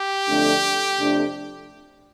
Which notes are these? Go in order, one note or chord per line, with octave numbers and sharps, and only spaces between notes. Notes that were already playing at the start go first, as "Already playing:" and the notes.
Already playing: G4
F2 D3 A3 D4
F2 C3 A3 D4